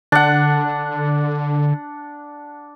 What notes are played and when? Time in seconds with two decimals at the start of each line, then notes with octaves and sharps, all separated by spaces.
0.12 D3 D4 F#5